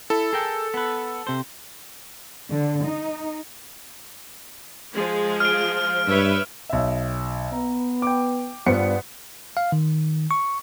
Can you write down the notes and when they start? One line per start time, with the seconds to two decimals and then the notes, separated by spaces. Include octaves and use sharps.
0.10 E4 A4
0.33 G#4 A#4 G5
0.74 B3 B4
1.27 C3 C5
2.51 D3
2.86 D#4
4.94 F3 G#3 G#4
5.40 F6 D7
6.08 G2 B4 C#5 E5
6.69 B1 E5
7.52 B3 A#5
8.02 G5 D6
8.66 G2 B3 F4 C5 D5 C#7
9.57 F5
9.72 D#3
10.31 C#6